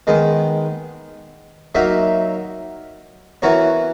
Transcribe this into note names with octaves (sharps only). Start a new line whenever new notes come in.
D#3 G#3 B3
F#3 A#3 D#4 A#4 E5
E3 B3 F#4 A#4 C#5